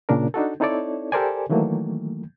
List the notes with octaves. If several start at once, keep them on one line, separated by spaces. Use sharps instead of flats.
A#2 C#3 D4 A#4
D4 D#4 F#4 A4
C4 D#4 E4 A4 C#5 D5
G4 A4 A#4 C5 D5 G#5
D#3 E3 F#3 A3 A#3